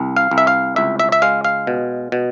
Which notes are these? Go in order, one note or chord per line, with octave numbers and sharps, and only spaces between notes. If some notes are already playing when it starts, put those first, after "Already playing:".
Already playing: C2
F5
C2
E5
F5
C#2 E5
E5
E5
G#3 F5
F5
B2
B2